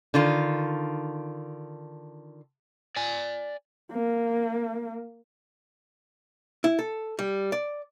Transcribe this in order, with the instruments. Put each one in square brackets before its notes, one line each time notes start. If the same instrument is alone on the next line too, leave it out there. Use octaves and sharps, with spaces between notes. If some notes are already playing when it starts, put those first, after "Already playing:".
[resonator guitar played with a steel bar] D3 D#3 F4
[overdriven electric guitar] D5 G#5
[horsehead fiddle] A#3
[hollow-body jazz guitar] E4
A4
G3
D5